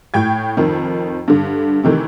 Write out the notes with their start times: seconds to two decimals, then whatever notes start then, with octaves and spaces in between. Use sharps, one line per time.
0.14 A2 G5 G#6
0.57 F2 D#3
1.28 G2 D3
1.84 C3 D#3 E3 A3